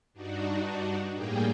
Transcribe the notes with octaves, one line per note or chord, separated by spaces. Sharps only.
G2 D4 D#4 F#4
A2 G3 A#3 G4 G#4 G5